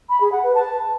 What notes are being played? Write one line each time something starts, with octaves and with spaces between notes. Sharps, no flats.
B5
G#4
F#5
B4
A5